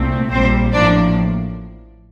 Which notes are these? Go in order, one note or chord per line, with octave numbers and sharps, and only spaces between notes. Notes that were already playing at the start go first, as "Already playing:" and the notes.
Already playing: C2 A#2 A3 C4
A#1 A#2 G3 C4 C5
A1 A2 F3 A#3 D4 D5